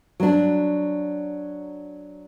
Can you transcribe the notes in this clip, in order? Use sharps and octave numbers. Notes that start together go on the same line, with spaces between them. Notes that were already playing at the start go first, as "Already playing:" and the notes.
F#3 D4